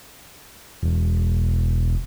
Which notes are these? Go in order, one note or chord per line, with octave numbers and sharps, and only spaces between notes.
E1